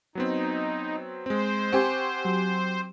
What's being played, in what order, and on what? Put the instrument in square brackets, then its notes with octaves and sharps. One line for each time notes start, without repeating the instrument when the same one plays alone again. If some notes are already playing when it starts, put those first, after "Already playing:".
[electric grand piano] F#3 B3 C4 [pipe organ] D#4
[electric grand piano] G#3 C4 [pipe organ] C5
[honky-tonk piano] C4 G4 [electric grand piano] F#5 G#5 [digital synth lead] C#6
[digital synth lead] F#3